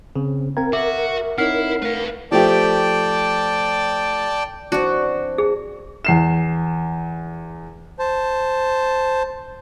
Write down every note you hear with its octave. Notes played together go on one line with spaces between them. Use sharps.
C#3 C4
C4 A#4 F5 G5 A#5 G#6
F#4 E5 D6
C4 D#4 E4 C#5 F#5 F6 C7
A3 B4 F5
F3 A3 G4 D5 G5 A5
E3 C4 D4 F#4
G#4
E2 C7 E7
C5 A5